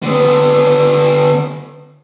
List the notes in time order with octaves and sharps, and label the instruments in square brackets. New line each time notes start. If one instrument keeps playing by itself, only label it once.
[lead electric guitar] D3 B3